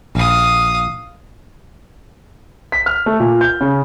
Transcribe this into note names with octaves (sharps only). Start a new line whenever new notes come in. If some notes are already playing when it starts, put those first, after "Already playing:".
A#1 F5 D#6
B6
F6
A3
A#2
G6
C#3